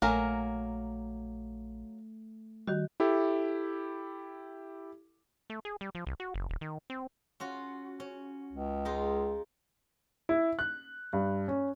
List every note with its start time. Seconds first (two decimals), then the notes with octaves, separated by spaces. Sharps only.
0.02 A#1 F#3 A3 A#3 A#4 G#5
2.67 D#3 G3 F#4
3.00 E4 G4 A4 E5
5.50 A3
5.65 G#4
5.81 G3
5.95 F3
6.07 C2
6.20 F#4
6.34 F#1
6.50 D#1
6.61 D#3
6.90 C4
7.40 C#4 F4 F#4
8.00 C#4
8.53 C#2
8.85 G#3 D#4 F4
10.29 E4
10.59 F#6
11.13 G2
11.48 C#4